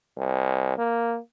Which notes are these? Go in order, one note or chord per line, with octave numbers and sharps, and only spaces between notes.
C2
A#3